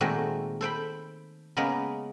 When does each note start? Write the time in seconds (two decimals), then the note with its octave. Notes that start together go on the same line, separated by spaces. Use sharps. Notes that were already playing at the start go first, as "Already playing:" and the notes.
0.01 A#2 D#3 G#3 A3 C4 F#4
0.61 A4 C5 G5 B5
1.57 C#3 G#3 A#3 B3